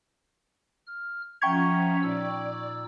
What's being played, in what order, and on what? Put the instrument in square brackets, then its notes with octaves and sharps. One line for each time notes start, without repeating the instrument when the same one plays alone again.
[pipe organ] F6
[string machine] F3 C#4 [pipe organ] E5 F#5 A#5 [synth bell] G5 C#6 G#6
[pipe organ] A#2 D#4 E6 [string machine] D5